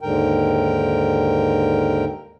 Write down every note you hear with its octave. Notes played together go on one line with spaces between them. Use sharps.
D#2 G#2 D3 A#4 G5